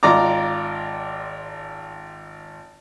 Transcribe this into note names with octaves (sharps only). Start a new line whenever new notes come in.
G#1 F4 D5 A#5 D6